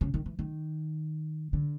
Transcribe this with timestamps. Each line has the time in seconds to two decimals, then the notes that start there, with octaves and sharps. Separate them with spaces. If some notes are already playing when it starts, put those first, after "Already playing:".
0.01 C#3
0.14 D#3
0.26 E3
0.39 D#3
1.53 D3